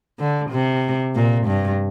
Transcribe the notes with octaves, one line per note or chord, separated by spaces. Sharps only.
D3
C3
A#2
G2